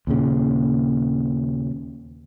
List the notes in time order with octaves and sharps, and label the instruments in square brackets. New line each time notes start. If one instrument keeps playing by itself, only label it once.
[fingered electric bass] D#2 A#2 C#3